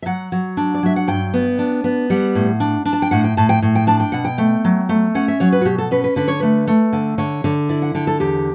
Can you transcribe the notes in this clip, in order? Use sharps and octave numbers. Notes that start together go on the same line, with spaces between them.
E5
F#3 F#5
F#3
D4
D5
F#3 E5
F#5
G2 G5
B3
D4
B3
G3 F#5
A2
D4
D4
A5
G5
A2 F#5
G5
A2 A5
G5
A2
G5
D4 A5
G5
B2 F#5
G5
A3
F#3
A3
C#4 F#5
E5
F#3 C#5
B4
F#4
B2 G4
A4
C#4 B4
B4
D3 B4
C#5
A3 B4
A3
D3
D3 C#5
D3
E4 D5
F#5
D3 G5
A4
E2 G4